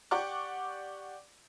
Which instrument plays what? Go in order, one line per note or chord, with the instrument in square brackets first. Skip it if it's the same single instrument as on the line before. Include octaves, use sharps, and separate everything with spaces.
[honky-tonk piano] G4 D5 F#5 C#6 D6